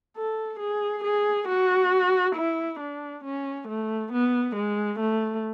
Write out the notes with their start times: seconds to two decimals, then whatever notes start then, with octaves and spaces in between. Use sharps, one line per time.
0.17 A4
0.60 G#4
1.04 G#4
1.48 F#4
2.35 E4
2.80 D4
3.24 C#4
3.68 A3
4.12 B3
4.56 G#3
5.00 A3